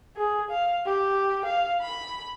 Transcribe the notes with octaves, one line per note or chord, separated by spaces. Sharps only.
G#4
F5
G4
F5
B5